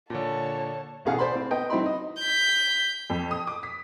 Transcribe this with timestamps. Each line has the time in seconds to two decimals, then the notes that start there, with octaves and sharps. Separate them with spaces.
0.10 A#2 D3 C#5 A5
1.05 A1 B2 G#4 F5 F#5
1.19 C5 D5 B5 C6
1.35 C4
1.51 B3 D#5 G5
1.70 F#3 C4 D#4 E4 B5 C6
1.82 D#4 D#5
2.19 G6 B6
3.10 F2
3.31 D#6
3.47 D6
3.63 B6